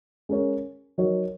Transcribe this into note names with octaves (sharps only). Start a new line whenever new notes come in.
G#3 C#4 A#4 C#5
F#3 D#4 A#4 C#5